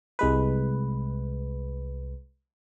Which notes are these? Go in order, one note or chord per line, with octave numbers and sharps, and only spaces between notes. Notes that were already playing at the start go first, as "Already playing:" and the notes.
C2 G#3 B4